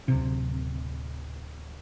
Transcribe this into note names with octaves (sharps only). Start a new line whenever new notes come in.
D1 C3